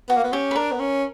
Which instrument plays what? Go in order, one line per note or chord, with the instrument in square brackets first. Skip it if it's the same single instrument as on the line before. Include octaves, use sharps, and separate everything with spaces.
[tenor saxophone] B3 [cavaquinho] F#4
[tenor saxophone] A#3
B3
[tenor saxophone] C#4 [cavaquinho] G4
[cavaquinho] B4
[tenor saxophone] D4 [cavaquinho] A#4
[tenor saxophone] B3
C#4